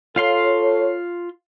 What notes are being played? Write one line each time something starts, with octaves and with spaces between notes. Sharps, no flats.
F4 A4 C#5 F5 C6